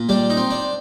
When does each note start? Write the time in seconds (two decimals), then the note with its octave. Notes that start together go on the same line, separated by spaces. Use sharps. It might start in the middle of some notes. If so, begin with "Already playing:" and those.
Already playing: A#2
0.09 G3 D4
0.30 D#4
0.37 C4
0.50 D4